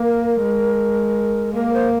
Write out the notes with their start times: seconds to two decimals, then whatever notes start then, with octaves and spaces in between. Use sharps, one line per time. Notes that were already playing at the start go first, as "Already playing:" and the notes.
Already playing: A#3 A#4
0.43 G#3
1.54 A#3 A#4
1.73 C5